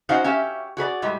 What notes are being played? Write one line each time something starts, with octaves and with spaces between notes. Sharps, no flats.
C#4 D#4 F#4 C5 F5 F#5
C#4 G4 E5 F5
F#4 G#4 B4 D5
A2 G3 G#3